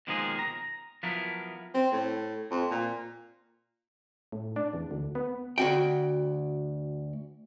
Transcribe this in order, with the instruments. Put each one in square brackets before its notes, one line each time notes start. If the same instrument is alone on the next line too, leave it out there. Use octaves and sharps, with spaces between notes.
[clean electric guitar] B2 D#3 F3 G#3 A#3 G#4
A#5
F3 F#3 B3 E4 A#4
[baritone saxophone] C4
A2
F2
A#2
[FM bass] A2
D4
E2
D2
B3
[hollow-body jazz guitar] D2 F#4 G5